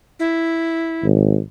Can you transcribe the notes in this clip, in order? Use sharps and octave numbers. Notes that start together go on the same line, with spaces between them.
E4
G#1